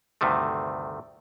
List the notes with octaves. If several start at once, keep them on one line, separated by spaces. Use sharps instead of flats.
D2 G2 C3 D#3 A3